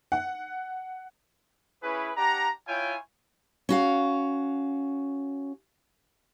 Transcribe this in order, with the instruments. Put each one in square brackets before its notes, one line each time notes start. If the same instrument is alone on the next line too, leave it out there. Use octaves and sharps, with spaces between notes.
[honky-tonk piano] F#5
[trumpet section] C#4 E4 G#4 B4
D4 G4 F#5 A#5
E4 F4 C#5 G5 G#5
[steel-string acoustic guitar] C#4 F#4 F5